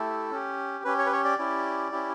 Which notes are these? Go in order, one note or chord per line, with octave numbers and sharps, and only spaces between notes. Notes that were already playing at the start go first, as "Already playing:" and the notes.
Already playing: A3 E4 G4 A4
C#4 G4
C#4 G4 B4
C#5
B4
C#5
D5
C#4 E4 G4
C#4 E4 G4